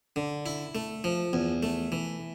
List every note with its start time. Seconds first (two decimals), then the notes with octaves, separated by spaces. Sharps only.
0.16 D3
0.46 E4
0.75 A3
1.04 F3
1.33 E2
1.63 A3
1.92 E3